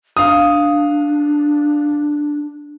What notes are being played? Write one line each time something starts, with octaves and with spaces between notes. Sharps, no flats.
D4 F5 D#6